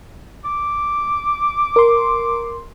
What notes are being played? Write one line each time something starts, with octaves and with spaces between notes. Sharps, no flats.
D6
A#4 C6